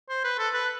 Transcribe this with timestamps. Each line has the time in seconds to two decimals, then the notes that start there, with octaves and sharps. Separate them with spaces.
0.09 C5
0.24 B4
0.38 A4
0.54 B4